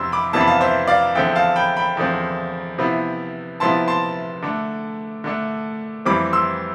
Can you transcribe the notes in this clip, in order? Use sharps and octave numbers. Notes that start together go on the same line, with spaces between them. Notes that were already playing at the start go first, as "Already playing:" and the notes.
Already playing: F2 C3 E3 B3 D4 C6 E6
B5 D6
F2 C3 E3 B3 D4 A5
B5
F5 A5
C5 E5
D5 F5
E2 D3 F3 C4 E5 G5
F5 A5
G5 B5
G5 B5
E2 D3 F3 C4
C3 F3 B3 E4
C3 F3 B3 E4 A5 C6
A5 C6
D3 A3 D4
D3 A3 D4
F2 E3 G3 C4 B5 D6
C6 E6